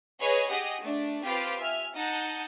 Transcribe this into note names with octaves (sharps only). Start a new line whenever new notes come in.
G#4 B4 C#5 D#5 G#5
G4 G#4 D#5 F#5 D#6
A3 D4
C4 F4 G4 B4 C5 F5
E5 G#5 F6
D#4 F#5 A5 D#6 G6